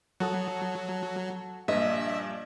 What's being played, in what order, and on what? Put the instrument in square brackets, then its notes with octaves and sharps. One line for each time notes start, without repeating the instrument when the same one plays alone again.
[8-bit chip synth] F#3 [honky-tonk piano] F#4 A4 D#6
[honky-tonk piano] A#1 G2 [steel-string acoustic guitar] D#5 [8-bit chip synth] E5